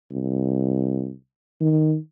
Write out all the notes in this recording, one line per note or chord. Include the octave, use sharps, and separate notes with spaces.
C2
D#3